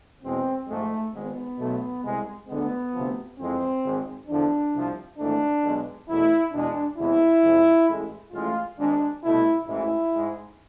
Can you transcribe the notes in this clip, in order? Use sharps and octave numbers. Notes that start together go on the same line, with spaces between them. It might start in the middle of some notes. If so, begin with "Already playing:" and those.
E2 B2 G#3 C4
G#2 F3 G#3 A3
G#1 G#2 G#3 B3
B1 B2 A3
C2 C3 G#3
D2 D3 G#3 B3
D2 C3 F3
F2 E3 G#3 C4
G#1 G#2 G#3
E2 D3 F3 D4
C2 C3 F3
G#1 G#2 E3 A3 D4
B1 B2 G#3
E2 B2 A3 E4
E2 B2 G#3 D4
E2 C3 E3 G#3 E4
F2 C3 G#3
A1 A2 G#3
A1 A2 G#3 F4
G#1 G#2 G#3 D4
C2 B2 A3 E4
A1 G#2 E3 G#3 E4
G#2 G#3